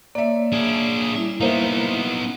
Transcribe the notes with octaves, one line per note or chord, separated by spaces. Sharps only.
A#3 C#5 D5 E5
D4 G#4
G3 E4
A#3 B3 D#4 C5 E5